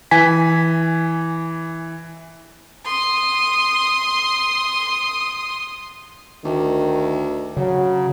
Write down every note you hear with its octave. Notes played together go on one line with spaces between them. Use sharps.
E3 G#5 B6
C6 D#6
D2 D#3
C#3 F#3